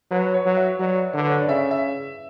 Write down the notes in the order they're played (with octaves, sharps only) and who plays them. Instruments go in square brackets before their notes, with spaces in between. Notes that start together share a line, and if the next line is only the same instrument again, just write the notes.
[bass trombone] F#3 [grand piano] B4
[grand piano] C#5
[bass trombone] F#3
[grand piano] E5
[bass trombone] F#3 [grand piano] D5
[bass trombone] D3 [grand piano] B4
[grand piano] C#5
D5
[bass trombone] C#3 [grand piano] E5
[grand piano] E5